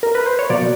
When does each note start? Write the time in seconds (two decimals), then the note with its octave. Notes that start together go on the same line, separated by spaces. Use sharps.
0.03 A#4
0.15 B4
0.26 C5
0.39 C#5
0.50 B2 F#3 A#3 D5